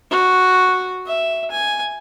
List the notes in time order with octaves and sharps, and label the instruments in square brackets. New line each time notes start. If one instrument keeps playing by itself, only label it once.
[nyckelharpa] F#4
E5
G#5